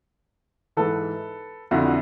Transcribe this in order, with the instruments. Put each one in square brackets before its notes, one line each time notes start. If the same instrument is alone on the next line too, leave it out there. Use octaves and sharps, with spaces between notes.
[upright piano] G#2 E3 A4 B4
F2 D3 E4 F#4